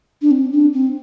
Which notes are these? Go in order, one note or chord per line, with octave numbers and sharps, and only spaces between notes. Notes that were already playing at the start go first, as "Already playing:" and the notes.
D4
C4
D4
C4